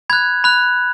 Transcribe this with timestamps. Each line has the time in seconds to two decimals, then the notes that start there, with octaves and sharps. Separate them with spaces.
0.10 B5 F#6 G#6
0.44 B5 F#6